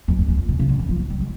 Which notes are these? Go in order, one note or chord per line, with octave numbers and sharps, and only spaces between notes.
F2
F2
E2
F2
B2
C#3
D3
E3
F3
F#3
G3
G#3